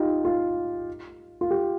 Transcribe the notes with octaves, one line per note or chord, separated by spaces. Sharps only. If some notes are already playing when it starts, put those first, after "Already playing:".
Already playing: D#4 F4 G4
F4
F4
G4